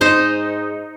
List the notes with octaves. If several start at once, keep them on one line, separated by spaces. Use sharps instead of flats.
G#2 D#4 C5 D#5